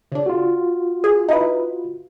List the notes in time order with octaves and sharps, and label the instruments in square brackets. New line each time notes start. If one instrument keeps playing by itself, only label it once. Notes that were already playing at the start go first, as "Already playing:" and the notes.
[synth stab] C#3 D4
[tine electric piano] F4 F#4
[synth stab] G#4
D#4 E4 B4